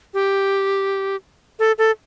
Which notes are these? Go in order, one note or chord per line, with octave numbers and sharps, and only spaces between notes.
G4
A4
A4